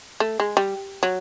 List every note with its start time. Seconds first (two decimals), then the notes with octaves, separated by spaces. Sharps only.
0.20 A3
0.40 G#3
0.57 G3
1.03 F#3